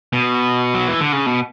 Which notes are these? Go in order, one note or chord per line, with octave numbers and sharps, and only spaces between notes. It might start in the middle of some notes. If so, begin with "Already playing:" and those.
B2
F#3
E3
D3
C#3
B2